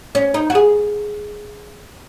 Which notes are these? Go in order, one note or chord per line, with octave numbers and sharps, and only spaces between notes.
C#4
D#4
F#4
G#4